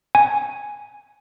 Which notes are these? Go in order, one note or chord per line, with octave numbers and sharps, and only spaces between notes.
G#5